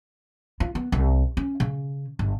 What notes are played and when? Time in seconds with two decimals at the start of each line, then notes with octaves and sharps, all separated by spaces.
0.60 F4
0.75 B3
0.92 C2
1.37 C#4
1.60 C#3
2.19 G1